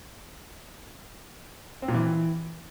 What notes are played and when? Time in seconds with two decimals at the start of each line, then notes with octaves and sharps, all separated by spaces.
1.82 C4
1.88 A#2
1.94 E3